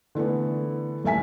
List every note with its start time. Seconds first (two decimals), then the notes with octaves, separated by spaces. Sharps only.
0.15 D3 E3 A3 B3
1.04 D#1 A3 E5 G#5 B6